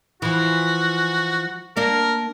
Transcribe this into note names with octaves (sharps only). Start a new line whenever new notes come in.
E3 F3 F#4
A#3 D4 A#4